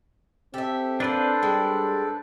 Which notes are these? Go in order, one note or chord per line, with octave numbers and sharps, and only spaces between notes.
C4 G4 A4 E5
A#3 D4 A4 B4 C5 D5
G3 G#3 C4 G5